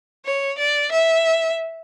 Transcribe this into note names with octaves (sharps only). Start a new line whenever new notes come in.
C#5
D5
E5